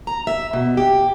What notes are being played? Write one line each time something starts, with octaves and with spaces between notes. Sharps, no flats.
A#5
E5
B2
G4